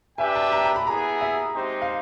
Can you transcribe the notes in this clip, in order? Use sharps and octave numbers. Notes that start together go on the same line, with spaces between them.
D4 G4 B4 E5 G5 G#5
A5
A#5
A#5
B5
B3 E4 G#4 A#5
E5
G#3 C4 D#4 G4 C5
F5